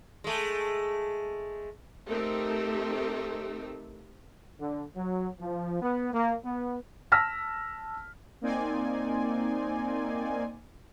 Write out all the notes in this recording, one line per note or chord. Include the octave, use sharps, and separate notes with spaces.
G#3 A3
A3 C4 D#4 G4 A#4
D3
F#3
F3
B3
A#3
B3
A5 E6 F6 A#6 B6
A#3 C4 D#4 D5 G#5 C6